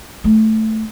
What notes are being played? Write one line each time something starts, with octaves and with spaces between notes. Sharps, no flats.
A3